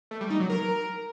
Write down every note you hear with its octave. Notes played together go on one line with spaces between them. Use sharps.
A3
G3
D#4
F#3
A#4